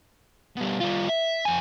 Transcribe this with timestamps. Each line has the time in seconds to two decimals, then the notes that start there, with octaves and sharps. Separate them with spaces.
0.56 B2 G3
0.80 G3 F4
1.08 E5
1.45 F2 G#5